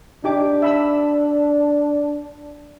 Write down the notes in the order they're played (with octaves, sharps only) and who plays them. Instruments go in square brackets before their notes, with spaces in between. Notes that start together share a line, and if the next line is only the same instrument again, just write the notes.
[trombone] D4 [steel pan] D#4 G4 D6
[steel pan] E5 B5 E6